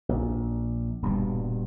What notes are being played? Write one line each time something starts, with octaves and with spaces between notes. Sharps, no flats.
A#1
D#1 G2 B2 G3